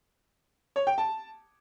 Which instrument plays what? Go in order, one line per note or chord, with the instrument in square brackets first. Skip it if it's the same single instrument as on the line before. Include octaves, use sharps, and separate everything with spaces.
[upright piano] C#5
G5
A5